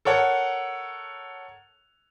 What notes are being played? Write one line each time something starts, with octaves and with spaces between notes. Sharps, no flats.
A4 A#4 C#5 F#5